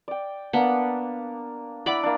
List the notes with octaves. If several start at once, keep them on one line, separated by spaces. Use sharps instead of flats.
D5 G5
A#3 B3 D4 A5
E4 D5 F#5 B5 D6
A#3 D4